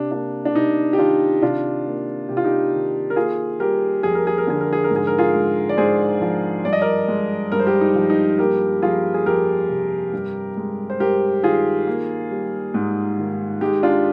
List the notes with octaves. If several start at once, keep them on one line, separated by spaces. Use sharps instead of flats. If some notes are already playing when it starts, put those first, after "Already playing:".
Already playing: C3 D4
A#3 D4
D4
C3 D#4
G4
D#3 D4 F4
C3 D4 F4
A#3
C3 G4
F4
D#4 G4
D#3
A#4
A#3 F4 G#4
G3 G4 A#4
F2 G#4
A#4
G#4
A#4
D3 G#4
A#4
G#4
A#4
G#2
G#4
A#4
F4 G#4
G#3
D5
G#2 G#4 C5
F3
G2 D5
D#5
A#4 D5
G#3
G2 A#4
C5
G4 A#4
D#4
F3
D#4
A#3 G4 A#4
F3 F4 G#4
G#4
F2 G4 A#4
C3
G2
G#3
C5
G2 G4 A#4
D#3 F4 G#4
A#3
G3
G#2
D#3
G#3 D#4 G4
D4 F4